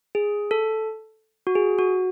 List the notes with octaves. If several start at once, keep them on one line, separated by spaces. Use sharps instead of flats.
G#4
A4
F#4
G#4
F#4